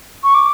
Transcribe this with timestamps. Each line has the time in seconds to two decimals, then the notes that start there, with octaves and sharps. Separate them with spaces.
0.24 C#6
0.34 D6